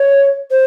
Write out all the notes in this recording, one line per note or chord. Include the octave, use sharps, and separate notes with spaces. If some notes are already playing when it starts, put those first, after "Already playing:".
Already playing: C#5
C5